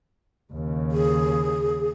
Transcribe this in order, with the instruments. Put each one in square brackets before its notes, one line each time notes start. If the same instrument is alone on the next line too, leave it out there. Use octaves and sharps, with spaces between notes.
[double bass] D#2 C#3
[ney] G#4